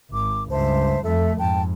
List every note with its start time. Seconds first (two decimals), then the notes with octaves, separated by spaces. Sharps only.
0.11 G#1 D6
0.50 C#2 G2 C5 E5 A5
1.04 F2 A3 A4 E5
1.37 F2 G#2 G5 A5